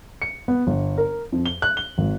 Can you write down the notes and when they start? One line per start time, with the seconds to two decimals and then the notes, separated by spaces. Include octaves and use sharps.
0.22 C#7
0.48 B3
0.67 G1
0.98 A#4
1.32 F2
1.46 G7
1.62 F#6
1.77 G7
1.98 G#1